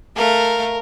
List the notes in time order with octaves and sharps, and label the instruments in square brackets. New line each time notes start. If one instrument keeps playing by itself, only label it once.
[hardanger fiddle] A3 F5 [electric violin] A#4